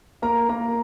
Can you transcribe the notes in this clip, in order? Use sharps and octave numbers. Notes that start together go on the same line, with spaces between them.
A#3 A#4 A#5
A#3 A#4 A#5